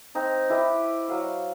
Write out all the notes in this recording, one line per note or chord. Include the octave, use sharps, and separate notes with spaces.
C4 D#4 A#5
E4 G4 B4 D#5
F#3 F5 E6